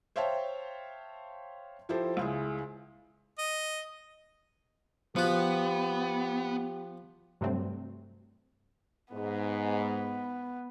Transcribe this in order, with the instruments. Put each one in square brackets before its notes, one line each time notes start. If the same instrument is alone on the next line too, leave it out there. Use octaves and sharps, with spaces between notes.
[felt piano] C5 C#5 E5 F5 G5 A5
F3 E4 G4 A4 C5
C#2 E4 G#4
[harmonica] D#5
[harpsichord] F3 F#4 [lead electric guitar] B3 [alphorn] G4
[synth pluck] G2 C3 F#3 G3 A3 C4
[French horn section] G#2 [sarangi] B3